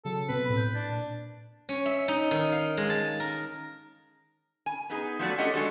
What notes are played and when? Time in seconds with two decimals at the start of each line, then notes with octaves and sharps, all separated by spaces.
0.05 C#3 F#3 A4
0.28 B2 B3 C4 B4
0.45 A2 C4 B5
0.57 G6
0.74 D4 A6
0.89 A#2
1.69 C#4
1.86 E5
2.08 D#4
2.31 D#3
2.52 F5
2.77 G#3
2.90 A5
3.20 A#4
4.66 G#5
4.90 B3 D#4 G#4
5.19 F3 F#3 A3 F#4 D5
5.38 F4 G4 A4 C#5 D#5 F#5
5.54 G#3 D4 F#4 A4